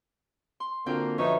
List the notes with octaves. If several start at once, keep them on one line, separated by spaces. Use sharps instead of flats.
C6
D3 A#3 C4 D4 F4 F#4 G5
F#2 F3 D#4 B4 C#5 E5